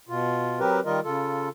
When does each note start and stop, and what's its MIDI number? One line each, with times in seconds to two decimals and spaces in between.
0.09 0.59 47
0.09 0.59 65
0.60 0.80 54
0.60 0.80 60
0.60 0.80 67
0.60 0.80 70
0.60 0.80 71
0.85 1.00 51
0.85 1.00 55
0.85 1.00 65
0.85 1.00 70
0.85 1.00 75
1.04 1.49 49
1.04 1.49 65
1.04 1.49 69